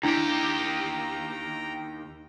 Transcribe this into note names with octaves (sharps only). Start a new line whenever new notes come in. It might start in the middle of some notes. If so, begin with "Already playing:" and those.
D#2 D4 E4 G4 G5 A#5